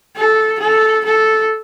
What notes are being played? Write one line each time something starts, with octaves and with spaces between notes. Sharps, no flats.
A4
A4
A4